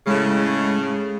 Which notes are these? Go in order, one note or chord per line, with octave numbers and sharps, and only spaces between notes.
A2 C#3 G#3